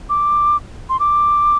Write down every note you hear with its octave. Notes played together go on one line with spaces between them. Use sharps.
D6
C6
D6